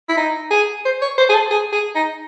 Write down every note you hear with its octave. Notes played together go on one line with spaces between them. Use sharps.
E4
D#4
G#4
C5
C#5
C5
G#4
A4
G#4
G#4
D#4